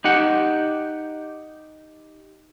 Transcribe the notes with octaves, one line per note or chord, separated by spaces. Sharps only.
D#4 G4 F#5